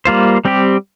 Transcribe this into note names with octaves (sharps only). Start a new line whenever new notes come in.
G3 A#3 F4 C5
G3 C4 G4